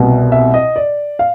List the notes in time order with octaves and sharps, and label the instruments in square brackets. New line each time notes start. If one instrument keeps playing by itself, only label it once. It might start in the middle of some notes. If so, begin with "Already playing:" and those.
Already playing: [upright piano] C2 B2
E5
D#5
D5
F5